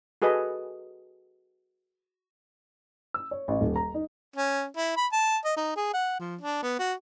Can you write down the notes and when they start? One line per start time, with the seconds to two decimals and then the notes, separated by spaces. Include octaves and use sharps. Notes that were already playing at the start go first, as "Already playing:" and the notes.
0.22 F#4 G#4 A4 B4 D#5
3.14 E6
3.31 C#5
3.48 A1
3.61 D#1
3.76 A#5
3.94 D#4
4.36 C#4
4.77 E4
4.97 B5
5.12 A5
5.45 D#5
5.57 D#4
5.76 G#4
5.93 F#5
6.19 F3
6.41 D4
6.62 B3
6.79 F#4